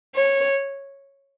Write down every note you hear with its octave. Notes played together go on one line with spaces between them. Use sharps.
C#5